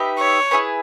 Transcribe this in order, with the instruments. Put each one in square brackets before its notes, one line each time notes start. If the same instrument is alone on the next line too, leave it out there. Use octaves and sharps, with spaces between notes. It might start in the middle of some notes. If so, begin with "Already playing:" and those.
Already playing: [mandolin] D#4 G4 B4 E5
[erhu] C#5
[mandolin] E4 G#4 B4